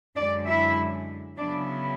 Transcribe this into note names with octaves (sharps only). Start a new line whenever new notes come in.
F#2 D3 G#3 D4 D5
E4 E5
C#3 F#3 B3 D4 E4 D5